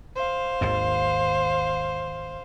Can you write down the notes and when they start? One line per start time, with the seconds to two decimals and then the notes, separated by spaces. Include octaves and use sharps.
0.15 C5 F5
0.61 G#1 D#2 G#2